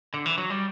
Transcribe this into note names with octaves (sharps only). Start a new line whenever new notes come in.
D3
E3
F#3
G3